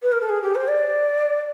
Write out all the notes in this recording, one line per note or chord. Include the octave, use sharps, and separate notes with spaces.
B4
A#4
A4
G#4
G4
C5
D5